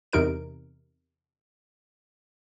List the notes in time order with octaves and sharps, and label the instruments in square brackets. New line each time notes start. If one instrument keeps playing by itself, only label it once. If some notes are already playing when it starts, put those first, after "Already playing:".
[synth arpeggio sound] E2 C3 D#4 A#4 D7